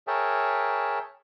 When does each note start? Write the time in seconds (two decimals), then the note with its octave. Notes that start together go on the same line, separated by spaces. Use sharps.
0.07 G#4 A#4 C#5 E5 G5 A5